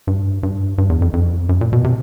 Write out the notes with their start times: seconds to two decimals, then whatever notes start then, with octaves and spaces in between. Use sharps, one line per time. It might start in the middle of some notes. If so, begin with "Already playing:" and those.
0.07 G2
0.43 G2
0.78 G2
0.90 E2
1.02 F2
1.13 F2
1.49 F#2
1.61 A#2
1.73 B2
1.84 C3